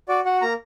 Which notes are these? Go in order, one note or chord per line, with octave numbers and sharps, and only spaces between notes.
F#4 D5
F#4 F#5
A#3 A#5